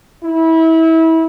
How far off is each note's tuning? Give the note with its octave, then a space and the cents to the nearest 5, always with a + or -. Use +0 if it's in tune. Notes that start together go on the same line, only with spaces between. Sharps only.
E4 -25